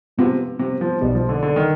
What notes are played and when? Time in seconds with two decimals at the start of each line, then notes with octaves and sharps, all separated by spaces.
0.17 G#2 C3 F3 B3 F4
0.59 C3
0.81 F3
1.01 B1 B2 G3 B3 D#4
1.15 F3
1.29 D3
1.43 D3
1.56 D#3